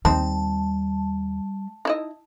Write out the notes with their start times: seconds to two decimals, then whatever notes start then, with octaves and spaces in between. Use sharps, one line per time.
0.05 D#2 G3 C4 D#4 A5
1.85 D#4 E4 D#5